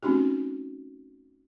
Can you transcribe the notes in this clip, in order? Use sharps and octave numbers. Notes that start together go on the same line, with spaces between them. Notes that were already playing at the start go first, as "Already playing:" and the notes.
A3 C4 C#4 D#4 F#4 G4